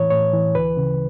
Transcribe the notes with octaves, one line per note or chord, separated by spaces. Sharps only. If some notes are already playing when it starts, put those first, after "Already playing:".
Already playing: A2 E3 C#5
A2 C#5
E3
D2 B4
C#3